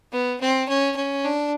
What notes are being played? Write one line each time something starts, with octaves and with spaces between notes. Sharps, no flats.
B3
C4
C#4
C#4
D4